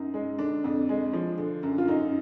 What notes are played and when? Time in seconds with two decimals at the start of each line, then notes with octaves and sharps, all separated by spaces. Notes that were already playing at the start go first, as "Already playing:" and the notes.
Already playing: F#2 D#4
0.14 G#3
0.39 D3 D4
0.64 F2
0.89 G#3
1.13 F3
1.38 D3
1.63 F#2
1.78 F4
1.88 F#2 D#4